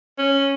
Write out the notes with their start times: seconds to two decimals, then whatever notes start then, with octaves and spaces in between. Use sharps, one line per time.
0.18 C#4